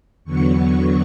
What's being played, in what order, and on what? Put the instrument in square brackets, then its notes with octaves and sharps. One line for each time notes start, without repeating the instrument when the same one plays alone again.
[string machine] E2 D3 F#3 B3 C#6